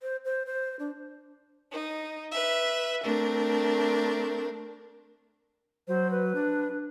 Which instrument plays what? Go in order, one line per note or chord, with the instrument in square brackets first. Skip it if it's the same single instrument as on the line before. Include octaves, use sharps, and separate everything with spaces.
[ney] C5
C5
C5
D4
[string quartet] D#4
B4 E5
A3 C4 D4 A#4
[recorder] F#3 [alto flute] C5
[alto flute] B4
[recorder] D4